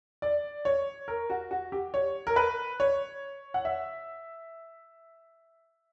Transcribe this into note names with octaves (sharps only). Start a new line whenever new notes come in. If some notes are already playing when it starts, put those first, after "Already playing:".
D5
C#5
A#4
F#4
F#4
G4
C#5
A#4
B4
C#5
F#5
E5